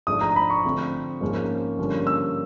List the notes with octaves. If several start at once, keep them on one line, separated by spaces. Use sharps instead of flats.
G#2 F3 A3 D4 D#6
A#5
B5
C#6
D3 F3 A3 C4
G#2 F3 A#3 C#4
G2 D3 F3 A#3 C#4
E6